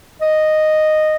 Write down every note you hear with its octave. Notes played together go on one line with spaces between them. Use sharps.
D#5